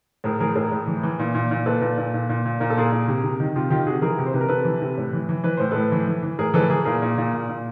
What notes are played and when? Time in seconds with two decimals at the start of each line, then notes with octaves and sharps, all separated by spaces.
0.24 A2 G#4 A#4
0.40 E3 G#4 A#4
0.55 A2 G#4 A#4
0.72 A2
0.87 E3
1.03 E3
1.19 A#2
1.35 A#2
1.51 A#2
1.66 A#2 A4 B4
1.81 A#2
1.98 A#2
2.14 A#2
2.29 A#2
2.45 A#2
2.60 A#2 A#4
2.70 A4
2.77 A#2 G#4 A#4
2.92 A#2
3.08 C3
3.24 C3
3.40 D#3
3.56 C3 F4 G4
3.70 D#3 F4 G4
3.86 C3 F#4 G#4
4.02 E3 G#4 A#4
4.19 C3
4.26 C5
4.34 C3 B4
4.41 A#4
4.49 C3 A4 B4
4.65 E3
4.82 C3
4.97 A2
5.13 E3
5.29 E3
5.44 E3 B4
5.57 A2 C5
5.71 A2 A4 B4
5.92 E3
6.07 E3
6.23 E3
6.39 A2 G#4 A#4
6.54 E3 A4 B4
6.70 E3 G#4 A#4
6.85 A#2 G#4 A#4
7.02 A#2
7.18 A#2
7.34 A#2
7.49 A#2